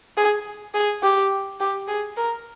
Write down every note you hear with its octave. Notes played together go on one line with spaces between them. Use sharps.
G#4
G#4
G4
G4
G#4
A#4